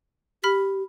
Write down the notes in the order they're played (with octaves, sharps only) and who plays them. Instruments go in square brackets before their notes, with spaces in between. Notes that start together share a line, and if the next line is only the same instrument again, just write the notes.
[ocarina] G4 [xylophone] B5 F6 B6